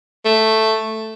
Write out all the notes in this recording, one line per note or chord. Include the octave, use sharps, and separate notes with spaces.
A3